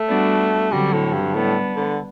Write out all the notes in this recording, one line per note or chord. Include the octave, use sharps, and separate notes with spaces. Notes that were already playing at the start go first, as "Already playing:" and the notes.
Already playing: A3
G3 B3 D4 F#4
D3 F#3 G3 C4 F#4 A4
A2
G2
A2 G3 B3 D4
D3